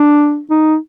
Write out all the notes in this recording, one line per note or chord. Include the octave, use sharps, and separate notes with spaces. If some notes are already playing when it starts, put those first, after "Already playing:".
Already playing: D4
D#4